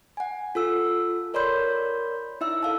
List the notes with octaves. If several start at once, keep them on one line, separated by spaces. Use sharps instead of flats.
F#5 G#5
F4 A4 E6
A#4 C#5 D5 B5 C6 G6
D#4 E4 E5 E6
A4 F5 A5